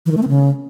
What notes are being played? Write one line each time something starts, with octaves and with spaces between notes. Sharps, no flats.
E3
D#3
A3
C4
C#3